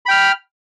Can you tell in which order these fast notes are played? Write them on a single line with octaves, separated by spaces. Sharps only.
B5 G5 F6